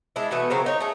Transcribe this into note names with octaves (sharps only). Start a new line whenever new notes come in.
G#3 D4 E4
B2 E3 A3 B3
C#3 F#3 C4 A#4
D#4 C#5
A3 G#4